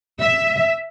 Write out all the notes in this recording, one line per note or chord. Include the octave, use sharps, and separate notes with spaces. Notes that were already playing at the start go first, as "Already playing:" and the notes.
E5